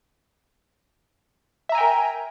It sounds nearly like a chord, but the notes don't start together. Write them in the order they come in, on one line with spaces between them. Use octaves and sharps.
E5 A#5 G#5 G5 A#4